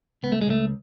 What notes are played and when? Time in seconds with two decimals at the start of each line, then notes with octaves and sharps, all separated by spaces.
0.23 C#2 B3
0.32 A3
0.41 G#3
0.47 C#2 A3